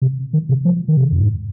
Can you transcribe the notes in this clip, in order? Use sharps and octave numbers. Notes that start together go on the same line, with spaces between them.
C3
D#3
C3
F3
D#3
C3
F2
G#2